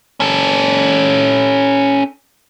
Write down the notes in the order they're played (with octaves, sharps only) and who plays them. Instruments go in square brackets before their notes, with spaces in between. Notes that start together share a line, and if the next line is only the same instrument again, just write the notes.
[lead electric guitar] C#4 A4